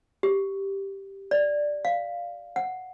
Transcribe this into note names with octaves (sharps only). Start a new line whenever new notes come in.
G4
D5
F5
F#5